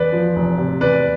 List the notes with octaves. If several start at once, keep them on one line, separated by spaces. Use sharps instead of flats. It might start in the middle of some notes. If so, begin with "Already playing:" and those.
Already playing: E2 B4 D5
F3
F1
C3
E2 B4 D5